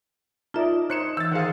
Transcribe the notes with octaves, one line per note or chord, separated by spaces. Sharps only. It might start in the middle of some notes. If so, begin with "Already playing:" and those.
D#4 F4 A#4 D5 E5 A5
D#4 C5 C#5 F#6 C#7 E7
E3 E6 A6
D#3 G#4 C5 F5 F#5